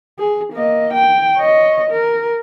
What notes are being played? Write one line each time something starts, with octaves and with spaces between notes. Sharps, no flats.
G#4
A#3 D#5
G5
C#5 D#5
A#4